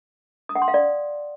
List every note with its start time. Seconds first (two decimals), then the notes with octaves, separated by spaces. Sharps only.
0.49 D#6
0.56 F#5
0.62 C6
0.68 F5
0.74 D5